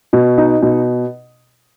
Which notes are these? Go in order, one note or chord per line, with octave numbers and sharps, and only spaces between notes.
B2
D#4
B2